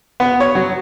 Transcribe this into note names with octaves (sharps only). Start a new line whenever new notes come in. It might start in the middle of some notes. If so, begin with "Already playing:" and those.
B3
C#5
F#3